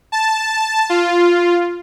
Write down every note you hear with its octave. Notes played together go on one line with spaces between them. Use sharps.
A5
F4